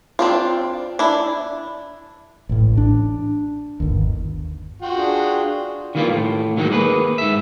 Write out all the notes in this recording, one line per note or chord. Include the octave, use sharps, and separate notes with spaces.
C4 D4 F4
D4 E4
A1 A2
D4
G1 D#2
F4 F#4 G5
D4 G#4
D#3 E3 G3 A#3 F4
A2
D#3 F#3 G#3 A#3 D#4
A#3 G#4 B4
G#2 E5